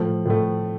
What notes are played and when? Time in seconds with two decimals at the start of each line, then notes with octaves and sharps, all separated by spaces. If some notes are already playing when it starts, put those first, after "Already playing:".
Already playing: A2 F3 A3
0.26 A2 F3 A3